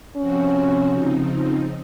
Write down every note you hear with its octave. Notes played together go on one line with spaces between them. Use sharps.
C3 F3 C4 C#4 F#4
C#3 F3 C4 D#4